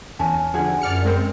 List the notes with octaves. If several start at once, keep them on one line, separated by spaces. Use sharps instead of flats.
E2 C#4 G#5 A5
D3 F3 F#4 G#4
F#2 D5 F6 C#7
G#3 C4 A#4